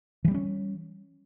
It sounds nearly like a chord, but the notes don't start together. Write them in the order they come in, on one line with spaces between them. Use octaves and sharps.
E3 G3 B3 C#4